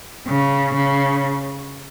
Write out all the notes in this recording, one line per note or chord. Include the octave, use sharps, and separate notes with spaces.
C#3
C#3